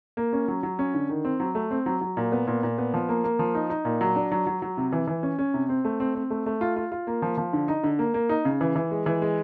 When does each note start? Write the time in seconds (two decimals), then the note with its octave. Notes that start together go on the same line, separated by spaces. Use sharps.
0.17 A#3
0.33 C#4
0.48 F#3
0.63 F#3
0.79 C#4
0.94 D3
1.09 D#3
1.25 C4
1.40 F#3
1.55 A3
1.71 C4
1.86 F#3
2.01 F#3
2.17 A#2
2.32 B3
2.47 A#2
2.63 A#2
2.78 B3
2.94 F3
3.09 A#3
3.24 A#3
3.39 F3
3.55 D#4
3.70 D#4
3.85 A#2
4.01 F#3
4.16 D4
4.32 F#3
4.47 F#3
4.62 F#3
4.77 C3
4.93 E3
5.08 E3
5.23 C#4
5.39 C#4
5.54 C3
5.69 C4
5.85 A3
6.00 C4
6.15 C4
6.30 A3
6.46 A3
6.61 F4
6.76 F4
6.92 F4
7.07 A#3
7.22 F3
7.38 F3
7.53 D3
7.68 D#4
7.83 D3
7.99 A#3
8.14 A#3
8.29 D#4
8.45 C#3
8.61 E3
8.76 E3
8.91 G#3
9.06 E3
9.22 G#3